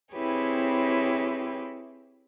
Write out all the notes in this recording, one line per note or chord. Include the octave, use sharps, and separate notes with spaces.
C4 E4 G4 G#4 B4 C#5